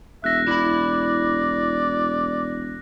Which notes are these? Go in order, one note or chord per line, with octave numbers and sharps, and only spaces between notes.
E1 E5 F#6 A#6
E4 D5 B5